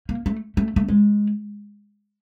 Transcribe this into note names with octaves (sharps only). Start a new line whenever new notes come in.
A#3
A3
A3
A3
G#3